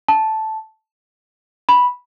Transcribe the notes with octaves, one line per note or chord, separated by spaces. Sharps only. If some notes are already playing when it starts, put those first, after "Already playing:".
A5
B5